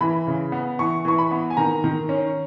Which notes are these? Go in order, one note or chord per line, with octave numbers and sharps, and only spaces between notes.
E3 B5
C#3
B3
E3 C#6
E3 C#6
B5
B3
G#5
D#3 A#5
D#3
C#4